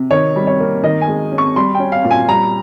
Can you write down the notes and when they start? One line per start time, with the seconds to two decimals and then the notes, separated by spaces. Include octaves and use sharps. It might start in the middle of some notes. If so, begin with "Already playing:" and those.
Already playing: C3
0.11 D#3 C#5
0.36 G3
0.47 C#5
0.60 A#3
0.83 D#3 D#5
1.01 G#5
1.08 G#3
1.32 C#4
1.38 C#6
1.56 G3 C6
1.75 G5
1.80 C#4
1.92 F5
2.04 A#2
2.11 G#5
2.28 G3 A#5